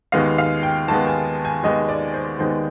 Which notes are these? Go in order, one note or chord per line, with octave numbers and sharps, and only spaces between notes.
D#2 D#3 G#3 B3 F5
F5
G5
D#2 D#3 G#3 B3 A5
G#5
G#5
D#2 D#3 G#3 B3 D#5
D5
C5
D#2 D#3 G#3 B3 C5